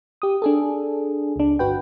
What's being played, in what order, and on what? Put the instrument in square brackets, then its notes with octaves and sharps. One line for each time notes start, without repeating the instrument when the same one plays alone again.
[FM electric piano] G4 D#6
D4 G#4 A4
C#2 D4
G1 F#4 B4 G5